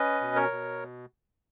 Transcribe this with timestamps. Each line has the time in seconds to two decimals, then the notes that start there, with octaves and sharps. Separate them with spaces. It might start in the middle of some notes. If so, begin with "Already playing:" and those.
Already playing: C#4 B4 D#5
0.21 B2
0.36 A#4 C#5
0.51 B2